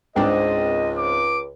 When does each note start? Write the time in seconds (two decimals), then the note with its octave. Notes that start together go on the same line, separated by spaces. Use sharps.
0.16 C#2 G#2 C4 D4 D#5
0.98 D6